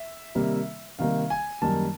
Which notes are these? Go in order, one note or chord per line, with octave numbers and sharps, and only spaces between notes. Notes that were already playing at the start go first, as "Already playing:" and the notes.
Already playing: E5
C3 D#3 G3 A#3
C3 D#3 G3 A#3 F5
G#5
F#2 D#3 G3 A#3 A5